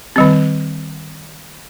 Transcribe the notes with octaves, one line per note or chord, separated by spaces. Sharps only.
D#3 G3 C4